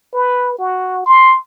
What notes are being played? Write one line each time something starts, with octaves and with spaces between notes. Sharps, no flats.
B4
F#4
C6